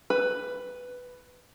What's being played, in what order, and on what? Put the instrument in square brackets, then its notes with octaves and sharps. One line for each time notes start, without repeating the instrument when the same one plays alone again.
[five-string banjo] B4